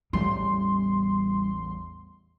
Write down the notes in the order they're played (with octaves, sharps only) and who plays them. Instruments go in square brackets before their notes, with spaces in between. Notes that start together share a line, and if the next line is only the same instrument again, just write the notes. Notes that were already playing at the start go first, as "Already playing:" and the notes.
[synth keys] A1 E2 C6 [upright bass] G3